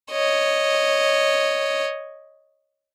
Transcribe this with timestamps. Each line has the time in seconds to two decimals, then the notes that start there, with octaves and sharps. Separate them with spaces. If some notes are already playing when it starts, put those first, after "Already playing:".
0.12 C#5 D#5